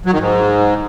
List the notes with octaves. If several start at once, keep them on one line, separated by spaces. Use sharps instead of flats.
F#3
D#3
G#2